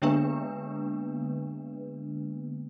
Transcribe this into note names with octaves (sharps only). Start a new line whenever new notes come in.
D3 G#3 A#3 B3 D4 B4